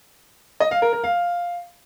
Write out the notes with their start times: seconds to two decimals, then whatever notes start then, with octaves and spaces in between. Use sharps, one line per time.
0.60 D#5
0.71 F5
0.82 A#4
0.93 A#4
1.04 F5